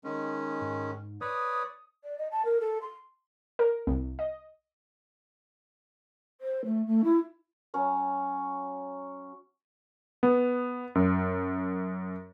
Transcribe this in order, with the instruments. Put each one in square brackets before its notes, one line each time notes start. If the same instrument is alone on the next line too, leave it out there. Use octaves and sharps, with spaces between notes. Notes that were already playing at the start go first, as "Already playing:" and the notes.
[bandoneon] D#3 G#3 C#4
[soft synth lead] G#2
[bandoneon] B4 C#5 D5 [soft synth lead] D#6
[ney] D5
D#5
A5
A#4
A4
C6
[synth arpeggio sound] A#4
C2
D#5
[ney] C5
A3
A3
E4
[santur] F#3 C#4 C#5
[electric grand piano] B3
F#2